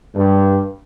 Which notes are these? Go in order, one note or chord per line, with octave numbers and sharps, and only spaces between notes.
G2